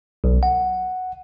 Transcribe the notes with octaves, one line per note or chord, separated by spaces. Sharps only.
B1
F#5